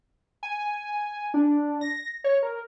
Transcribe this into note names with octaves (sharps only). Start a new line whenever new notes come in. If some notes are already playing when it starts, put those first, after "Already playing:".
G#5
D4
A#6
C#5
A#4